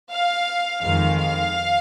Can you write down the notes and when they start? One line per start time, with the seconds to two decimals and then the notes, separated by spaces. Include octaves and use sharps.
0.11 F5
0.83 F2 D#3 G#3 F5
1.19 F5